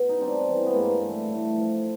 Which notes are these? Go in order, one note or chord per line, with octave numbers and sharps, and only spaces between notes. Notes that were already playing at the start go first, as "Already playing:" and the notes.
Already playing: B2
D#4
G3 C4 D4
E3
B3
G2 G#3 A#3
G2 A3
A2 A3
F3